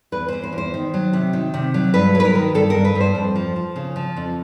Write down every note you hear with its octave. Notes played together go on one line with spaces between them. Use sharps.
E2 B4
E2 C5
C5
E2
C5
D#3
F#3
C3
D#3
C3
F#3
G2 B4
F#3
B4
A#4
D#3
G2 A4
G2 A#4
B4
G2
C5
F2
F3
F3
C#3
F3
F2